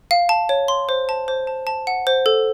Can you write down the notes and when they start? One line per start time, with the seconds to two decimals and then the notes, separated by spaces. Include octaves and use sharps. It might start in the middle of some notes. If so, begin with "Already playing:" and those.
0.11 F5
0.29 A5
0.49 C#5
0.68 C6
0.89 C5
1.09 A5
1.28 C5
1.47 A5
1.67 A5
1.87 F#5
2.07 C5
2.26 A4